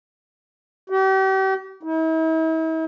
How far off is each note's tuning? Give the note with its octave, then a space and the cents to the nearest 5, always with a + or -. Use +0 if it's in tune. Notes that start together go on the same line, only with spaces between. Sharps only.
G4 -40
E4 -45